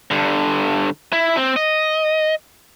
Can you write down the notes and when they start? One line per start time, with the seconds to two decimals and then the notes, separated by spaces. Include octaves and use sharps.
0.11 G2 D3
1.13 E4
1.37 C4
1.56 D#5